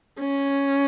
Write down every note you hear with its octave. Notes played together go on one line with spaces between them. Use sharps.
C#4